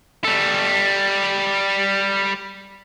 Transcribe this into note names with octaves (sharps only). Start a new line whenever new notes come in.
G3 A4